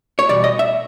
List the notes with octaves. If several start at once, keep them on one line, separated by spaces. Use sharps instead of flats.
C#5
E2 B2 G3 D5
D#5
E5